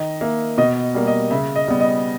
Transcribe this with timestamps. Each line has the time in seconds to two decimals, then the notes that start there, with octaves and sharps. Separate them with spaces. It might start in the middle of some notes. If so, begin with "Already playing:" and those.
Already playing: D#3 D#5
0.21 A#3 E5
0.58 B2 D#5
0.95 G3 A#3
1.07 D#5
1.31 C#3 E5
1.56 D#5
1.68 G3 B3
1.80 D#5